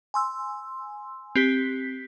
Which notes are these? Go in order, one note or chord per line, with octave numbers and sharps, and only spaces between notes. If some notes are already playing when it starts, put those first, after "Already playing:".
G#5 C6 E6
C4 G4 B6